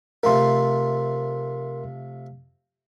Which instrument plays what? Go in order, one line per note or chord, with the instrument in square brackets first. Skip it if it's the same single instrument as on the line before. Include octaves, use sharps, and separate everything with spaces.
[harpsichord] C3 F3 A3 [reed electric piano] A#4 C6